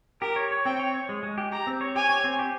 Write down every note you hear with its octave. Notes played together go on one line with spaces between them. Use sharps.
G4 A#4
C#5
C#5
C4 G5
C#5
C#5
G#3
G#3
G4
G4 A#5
C4
C#5
G4 G#5
C#5
C4
G4